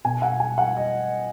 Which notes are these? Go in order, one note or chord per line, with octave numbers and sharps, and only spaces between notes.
B2 G#5
F#5
G#5
F#5
D#5